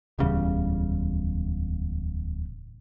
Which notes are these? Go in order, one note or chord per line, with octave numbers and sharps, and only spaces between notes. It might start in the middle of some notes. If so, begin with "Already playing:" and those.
D1 E2 C#3 G3